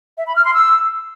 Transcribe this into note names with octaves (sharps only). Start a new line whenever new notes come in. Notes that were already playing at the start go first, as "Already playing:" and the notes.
E5
B5
F6
C6
E6